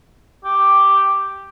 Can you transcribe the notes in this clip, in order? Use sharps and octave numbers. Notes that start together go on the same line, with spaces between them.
G4